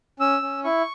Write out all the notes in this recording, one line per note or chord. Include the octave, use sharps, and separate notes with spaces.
C#4 E6
C#4
E4 C#6